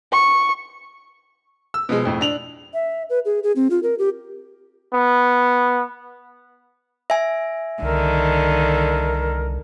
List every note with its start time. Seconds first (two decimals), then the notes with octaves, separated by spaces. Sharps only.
0.12 C#6
1.74 E6
1.89 B2 F3 G#3
2.05 F2 A2
2.21 D4 F7 F#7
2.74 E5
3.10 B4
3.25 G#4
3.43 G#4
3.56 C4
3.70 F4
3.83 A#4
3.99 G4
4.94 B3
7.10 E5 G#5
7.82 C2 D3 D#3 A#4